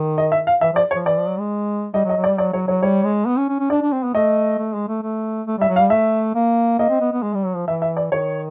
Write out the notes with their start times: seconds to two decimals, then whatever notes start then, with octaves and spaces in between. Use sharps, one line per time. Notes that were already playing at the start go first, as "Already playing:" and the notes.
Already playing: D#3
0.18 D#5
0.32 E5
0.47 F5
0.61 E3 E5
0.73 F3 D5
0.91 C#5
0.95 F3
1.06 E3 D5
1.17 F3
1.28 F#3
1.39 G#3
1.93 G3 D#5
2.05 F#3
2.09 D#5
2.16 F#3
2.24 D5
2.27 G3
2.38 F#3 D5
2.53 F#3 C#5
2.68 F#3 C#5
2.82 G3 C#5
3.05 G#3
3.26 B3
3.38 C#4
3.49 C#4
3.60 C#4
3.70 D4 D5
3.81 D4
3.92 C4
4.03 B3
4.14 A3 D#5
4.58 A3
4.74 G#3
4.88 A3
5.02 A3
5.47 A3
5.58 G3 E5
5.68 F#3
5.76 F5
5.80 G3
5.90 A3 E5
6.35 A#3
6.79 A#3 D#5
6.90 C4
7.01 B3
7.12 B3
7.23 G#3
7.34 G3
7.45 F#3
7.56 F3
7.67 E3 E5
7.82 E5
7.97 D5
8.11 D#3 C#5